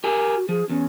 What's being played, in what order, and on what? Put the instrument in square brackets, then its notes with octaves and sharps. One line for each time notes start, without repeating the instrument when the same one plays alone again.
[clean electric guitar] G4 A#4 G#5
[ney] F#4
[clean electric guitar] F3 [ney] G#4
[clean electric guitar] E2 [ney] C#4